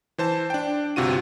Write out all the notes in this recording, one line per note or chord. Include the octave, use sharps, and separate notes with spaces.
E3 C5 A5
D4 G5
G1 C3 F4 F#4 D#7